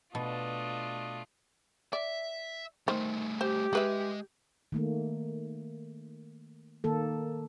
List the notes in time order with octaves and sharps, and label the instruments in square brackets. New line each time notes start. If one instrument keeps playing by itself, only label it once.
[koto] B2 [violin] A3 F4 [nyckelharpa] D4 D#5
[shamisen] D5 [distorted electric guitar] E5
[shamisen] D#3 C5 [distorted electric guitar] G3 A3
[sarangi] G4 [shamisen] C5
[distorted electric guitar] G#3 [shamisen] G#4 B4 E5
[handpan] D#3 A3 A#3
D#3 A#3 A4